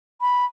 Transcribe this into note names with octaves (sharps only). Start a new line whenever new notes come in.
B5